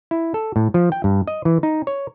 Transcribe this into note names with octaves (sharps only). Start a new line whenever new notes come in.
E4
A4
A2
F3
G5
G2
D#5
E3
D#4
C#5